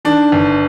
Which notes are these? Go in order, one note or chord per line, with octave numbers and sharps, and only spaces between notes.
D#3 D4
G1